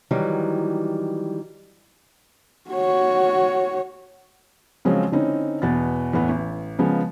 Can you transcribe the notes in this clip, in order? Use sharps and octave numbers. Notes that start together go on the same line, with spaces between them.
D#3 E3 F#3 G3
F#4 C#5
C#3 F3 F#3 G#3 C4 C#4
D3 C4 C#4 D#4 E4
E2 B2 B3 A6
E2 A2 B3
A1
C#3 F3 G#3 B3